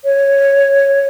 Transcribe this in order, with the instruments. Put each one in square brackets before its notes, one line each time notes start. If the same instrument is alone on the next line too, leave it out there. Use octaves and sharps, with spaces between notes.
[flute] C#5